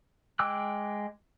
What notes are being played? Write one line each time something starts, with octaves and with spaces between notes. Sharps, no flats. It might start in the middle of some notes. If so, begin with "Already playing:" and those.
G#3 G5 D6 E6 F#6